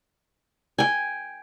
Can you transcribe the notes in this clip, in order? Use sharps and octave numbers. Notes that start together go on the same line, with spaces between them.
G5 G#5